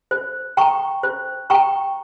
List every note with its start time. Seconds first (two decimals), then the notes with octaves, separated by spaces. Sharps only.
0.11 C5
0.57 G5 A#5 C#6
1.03 C5
1.50 G5 A#5 C#6